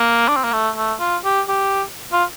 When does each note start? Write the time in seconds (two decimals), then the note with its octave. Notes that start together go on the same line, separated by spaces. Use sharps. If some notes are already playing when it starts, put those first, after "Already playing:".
Already playing: A#3
0.28 D4
0.36 C4
0.44 A#3
0.53 A3
0.76 A3
1.00 F4
1.25 G4
1.49 G4
2.12 F4